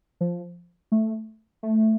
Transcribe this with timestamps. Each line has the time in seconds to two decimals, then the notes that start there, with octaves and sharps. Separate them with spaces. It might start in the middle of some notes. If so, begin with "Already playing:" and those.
0.21 F3
0.92 A3
1.63 A3